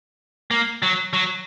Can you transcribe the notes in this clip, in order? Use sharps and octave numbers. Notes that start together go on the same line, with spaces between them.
A#3
F#3
F#3